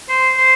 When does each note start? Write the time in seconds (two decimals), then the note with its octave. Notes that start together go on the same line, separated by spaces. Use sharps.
0.09 C5
0.37 C5